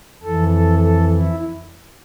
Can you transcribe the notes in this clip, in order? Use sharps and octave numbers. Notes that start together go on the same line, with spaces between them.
F2 E3 A4
A4
A4
E4